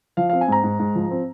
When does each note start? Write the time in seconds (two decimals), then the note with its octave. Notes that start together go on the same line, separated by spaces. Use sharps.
0.17 F3 F5
0.30 C4 F5
0.41 G#5
0.48 G#2 A#5
0.64 G#2
0.79 G#2
0.95 F3
1.11 C4